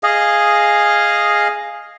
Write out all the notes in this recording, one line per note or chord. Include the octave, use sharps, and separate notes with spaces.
G#4 D#5 F5